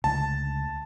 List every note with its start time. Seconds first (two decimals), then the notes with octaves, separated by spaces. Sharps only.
0.04 C#2 D3 A3 A5